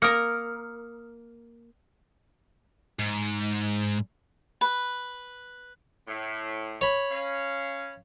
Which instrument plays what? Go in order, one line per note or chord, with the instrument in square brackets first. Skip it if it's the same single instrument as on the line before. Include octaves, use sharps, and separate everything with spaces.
[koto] A#3 A#4 [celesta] D#6 F6 C#7
[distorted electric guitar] G#2
[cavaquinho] B4
[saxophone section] A2
[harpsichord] C#5 B5
[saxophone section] C#4 F5